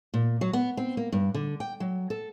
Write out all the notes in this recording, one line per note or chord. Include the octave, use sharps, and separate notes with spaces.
A#2
F#3
B3
C4
A#3
G2
D3
G5
F#3
A4